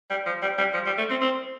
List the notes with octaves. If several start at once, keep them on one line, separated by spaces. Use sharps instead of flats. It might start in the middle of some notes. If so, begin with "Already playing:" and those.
G3
F3
G3
G3
F3
G3
A3
C4
C4